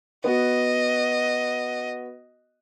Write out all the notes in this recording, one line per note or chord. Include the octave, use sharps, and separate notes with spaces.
B3 F#4 D#5